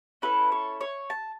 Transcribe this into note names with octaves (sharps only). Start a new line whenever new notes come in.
C#4 E4 A4 B4
C#5
C#5
A5